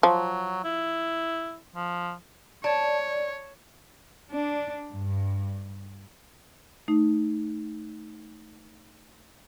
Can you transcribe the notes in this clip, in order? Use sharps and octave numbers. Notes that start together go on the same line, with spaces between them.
F3 F#3
E4
F3
C#5 D5 A5
D4
G2
A3 D#4